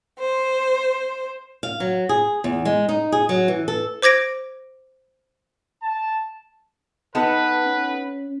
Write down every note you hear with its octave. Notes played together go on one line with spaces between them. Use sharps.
C5
F5
F#3
G#4
E2
G#3
D#4
G#4
F#3
E3
A4
C5 D6 G#6 A#6 D7
A5
B3 D#4 A4 B4
C#4